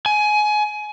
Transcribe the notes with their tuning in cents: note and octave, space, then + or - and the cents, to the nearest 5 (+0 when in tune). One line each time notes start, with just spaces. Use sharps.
G#5 +20